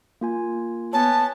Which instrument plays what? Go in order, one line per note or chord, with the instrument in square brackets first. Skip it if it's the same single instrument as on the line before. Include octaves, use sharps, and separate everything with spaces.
[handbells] A#3 F4 G#5
[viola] B3 [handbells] C#5 G#5 [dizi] A5